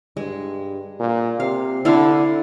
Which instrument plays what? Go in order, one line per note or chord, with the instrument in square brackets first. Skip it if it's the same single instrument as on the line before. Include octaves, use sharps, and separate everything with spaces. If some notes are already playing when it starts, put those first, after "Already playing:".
[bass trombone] G2 [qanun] G#3
[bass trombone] A#2
[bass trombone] C3 [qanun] F5
[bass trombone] D3 [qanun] E4 A4 F5